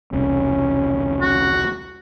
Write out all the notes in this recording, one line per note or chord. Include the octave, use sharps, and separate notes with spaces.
E1 C2 C3 C#4
F#4